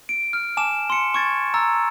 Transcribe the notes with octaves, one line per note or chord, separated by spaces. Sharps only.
D7
F6
G#5 A5 D6 E7
C6 C#7
C#6 G#6 A6
A#5 E6 A6